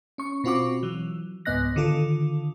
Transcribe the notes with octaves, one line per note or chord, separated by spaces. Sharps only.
C#4 C#6
B2 C4 F4 F#4 C#6 D6
E3 F#3
C#2 G#2 B3 D#5 F#6 A#6
D3 D#3 F4 A4